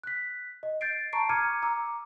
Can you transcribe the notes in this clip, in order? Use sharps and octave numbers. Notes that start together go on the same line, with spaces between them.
F#6 B6
D#5
G6 A6 C7 D7
A5 A#5 C#6 C7 D7
A#5 D6 F6 G#6 C#7 D#7
A#5 D6 E6